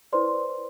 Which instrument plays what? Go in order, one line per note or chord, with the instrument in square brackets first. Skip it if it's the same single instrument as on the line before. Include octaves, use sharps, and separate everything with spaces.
[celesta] E4 B4 C5 D5 C6